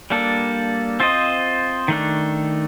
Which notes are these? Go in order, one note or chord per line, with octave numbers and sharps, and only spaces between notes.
G3 A#3 D4 A4
C4 F4 C5 D#5
D#3 A3 D4